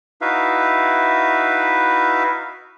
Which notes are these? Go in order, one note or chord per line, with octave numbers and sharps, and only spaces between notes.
D#4 E4 F#4 B4 E5 F5